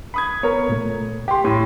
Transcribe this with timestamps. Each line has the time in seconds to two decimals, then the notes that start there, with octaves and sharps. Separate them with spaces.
0.14 B5 D#6 G#6
0.43 B3 A#4 C#5
0.69 A#2 A3
1.28 G4 C6
1.44 A2 G4